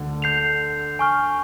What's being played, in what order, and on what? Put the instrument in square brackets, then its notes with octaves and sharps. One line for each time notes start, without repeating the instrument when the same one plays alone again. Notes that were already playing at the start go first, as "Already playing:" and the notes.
Already playing: [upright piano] D2 D3
[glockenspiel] G6 C7 F7
G#5 C#6 F6